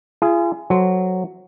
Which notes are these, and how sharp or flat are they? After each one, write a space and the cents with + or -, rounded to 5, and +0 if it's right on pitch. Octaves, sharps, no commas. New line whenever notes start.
F4 -40 G#4 +0
F#3 +0 A4 +5 C5 +0